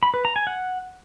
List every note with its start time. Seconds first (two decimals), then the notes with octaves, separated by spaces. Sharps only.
0.03 B5
0.14 B4
0.25 A#5
0.36 G#5
0.47 F#5